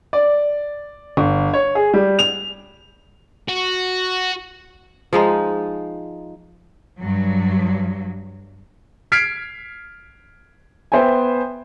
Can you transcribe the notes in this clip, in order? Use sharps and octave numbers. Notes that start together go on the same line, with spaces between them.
D5
G1
C#5
G#4
G3
F7
F#4
F3 G#3 D#4
G2 F#3
F6 G#6 B6 C7 D7
B3 C5 E5 G5 G#5